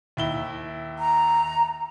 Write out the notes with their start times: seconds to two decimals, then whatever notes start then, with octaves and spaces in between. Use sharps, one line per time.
0.17 D#2 E4 G7
0.99 A#5